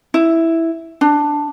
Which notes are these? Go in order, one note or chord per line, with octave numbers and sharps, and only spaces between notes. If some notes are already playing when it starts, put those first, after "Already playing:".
E4
D4